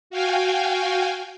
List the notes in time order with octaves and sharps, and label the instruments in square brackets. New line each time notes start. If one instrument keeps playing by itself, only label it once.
[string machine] F#4 F5 G5 G#5